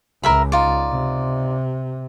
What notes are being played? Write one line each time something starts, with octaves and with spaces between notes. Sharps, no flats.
C#2 A#4 E5 B5
D#4 F4 D5
C3